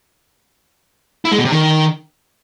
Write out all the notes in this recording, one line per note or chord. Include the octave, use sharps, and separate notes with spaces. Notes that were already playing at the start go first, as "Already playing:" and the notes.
E4
G#3
B2
C3
D#3